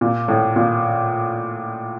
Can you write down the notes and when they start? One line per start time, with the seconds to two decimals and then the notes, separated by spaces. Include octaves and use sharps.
0.01 A#2
0.28 A2
0.56 A#2